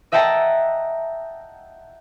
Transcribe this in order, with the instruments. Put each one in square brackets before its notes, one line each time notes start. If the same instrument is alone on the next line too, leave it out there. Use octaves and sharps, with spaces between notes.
[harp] D#5 E5 F#5 G5 A5 A#5